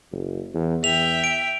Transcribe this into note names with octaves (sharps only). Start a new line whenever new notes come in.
F#1
E2
E2 E5 G5 F7
D7